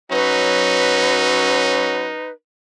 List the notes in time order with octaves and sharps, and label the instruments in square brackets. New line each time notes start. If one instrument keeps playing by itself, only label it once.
[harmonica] F#3 C#4 [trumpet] D#4 [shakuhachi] B4